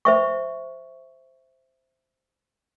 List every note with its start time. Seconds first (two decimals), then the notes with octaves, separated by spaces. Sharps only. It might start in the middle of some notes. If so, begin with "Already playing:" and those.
0.05 C5 E5 C#6